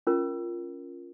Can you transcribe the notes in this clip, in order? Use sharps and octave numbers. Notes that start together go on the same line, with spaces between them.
C#4 F4 A#4